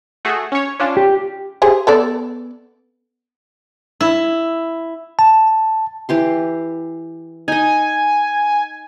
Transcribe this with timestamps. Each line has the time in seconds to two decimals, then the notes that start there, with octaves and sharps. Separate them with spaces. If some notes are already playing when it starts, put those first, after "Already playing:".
0.25 A3 F#4 G#4
0.52 C#4 C#5
0.79 C#4 D4 F4
0.97 G4
1.62 G4 G#4 C5
1.87 B3 A4 D5
4.01 E4
5.19 A5
6.09 E3 G4 C6
7.48 D#4 D#5 G#5